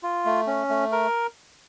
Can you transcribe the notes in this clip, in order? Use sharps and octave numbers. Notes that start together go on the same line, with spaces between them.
F4
A3
C#4
A3
A#4